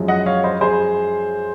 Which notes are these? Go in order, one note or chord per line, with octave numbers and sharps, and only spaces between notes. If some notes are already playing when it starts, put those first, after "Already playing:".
Already playing: F#2 F3 G#3
D#5 F#5
C#5 F5
C5 D#5
G#4 C5